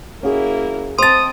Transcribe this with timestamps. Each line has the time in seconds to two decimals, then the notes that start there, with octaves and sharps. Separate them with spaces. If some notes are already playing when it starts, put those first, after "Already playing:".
0.23 A#3 C#4 E4 F#4 G#4
0.99 C4 C5 D#5 A5 C6 D#6 A6